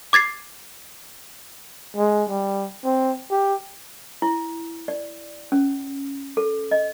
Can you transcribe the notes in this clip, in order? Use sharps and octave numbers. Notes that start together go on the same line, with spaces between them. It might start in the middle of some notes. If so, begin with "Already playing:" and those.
D6 G#6 A6 C7
G#3
G3
C4
G4
E4
D5
C#4
A4
D#5